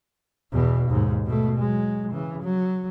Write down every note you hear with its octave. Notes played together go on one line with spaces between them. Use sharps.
E2 B2
D#2 G#2
B2 A3
F#3 G#3
C#3 E3
F#3